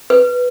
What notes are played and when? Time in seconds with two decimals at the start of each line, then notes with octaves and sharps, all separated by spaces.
0.10 B4